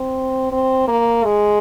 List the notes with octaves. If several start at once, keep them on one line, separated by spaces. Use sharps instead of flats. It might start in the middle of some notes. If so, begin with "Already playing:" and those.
Already playing: C4
C4
A#3
G#3